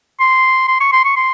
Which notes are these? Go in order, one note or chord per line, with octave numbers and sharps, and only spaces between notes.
C6
C6
C#6
C6
C#6
C6